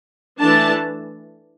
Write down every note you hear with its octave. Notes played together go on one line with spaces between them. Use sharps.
E3 A3 D4 A5